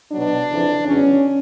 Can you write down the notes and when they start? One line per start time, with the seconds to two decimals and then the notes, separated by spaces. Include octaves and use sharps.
0.12 B2 F#3 D4
0.49 F2 C#3 E3
0.85 E2 C#3 F#3 C#4